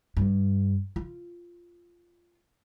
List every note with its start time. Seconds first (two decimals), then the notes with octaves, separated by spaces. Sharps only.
0.17 G2
0.96 F4